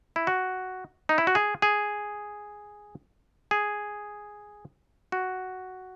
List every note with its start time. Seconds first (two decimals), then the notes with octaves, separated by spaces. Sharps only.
0.16 E4
0.27 F#4
1.09 D#4
1.18 E4
1.27 F#4
1.35 G#4
1.62 G#4
3.51 G#4
5.12 F#4